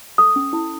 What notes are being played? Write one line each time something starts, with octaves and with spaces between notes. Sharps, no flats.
A4 D#6
C#4
E4